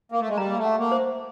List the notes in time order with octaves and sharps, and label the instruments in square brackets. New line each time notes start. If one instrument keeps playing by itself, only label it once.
[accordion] A#3
A3
G#3
[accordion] G3 [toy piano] A#5
[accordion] A#3
A3
[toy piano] F#5
[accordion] A#3
[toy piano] C5